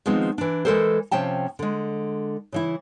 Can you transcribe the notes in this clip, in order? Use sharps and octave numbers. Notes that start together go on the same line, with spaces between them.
D#3 F3 G#3 B3 C4
E3 D4
E3 G#3 B3 A4 A#4 C5
C3 F3 C#4 G5 A5
D3 G#3
C#3 E3 E4